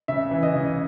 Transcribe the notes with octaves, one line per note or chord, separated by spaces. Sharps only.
C#3 E5
E3
D#5
C#3